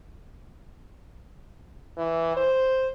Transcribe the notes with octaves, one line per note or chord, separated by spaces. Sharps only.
E3
C5